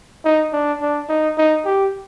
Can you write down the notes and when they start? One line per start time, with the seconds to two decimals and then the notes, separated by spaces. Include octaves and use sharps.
0.25 D#4
0.53 D4
0.81 D4
1.09 D#4
1.38 D#4
1.65 G4